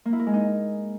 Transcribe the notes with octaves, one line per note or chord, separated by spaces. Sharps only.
A#3
E4
A#4
G#3
D#4